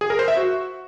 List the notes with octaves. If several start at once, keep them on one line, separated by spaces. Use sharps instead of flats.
G#4
A#4
C5
E5
F#4